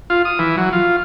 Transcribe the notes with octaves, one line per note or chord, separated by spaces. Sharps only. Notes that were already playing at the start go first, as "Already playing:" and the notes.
F4
D#6
E3
F#3
F4